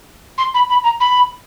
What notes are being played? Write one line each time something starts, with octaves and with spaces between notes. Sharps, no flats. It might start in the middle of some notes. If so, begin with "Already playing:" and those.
C6
B5
B5
A#5
B5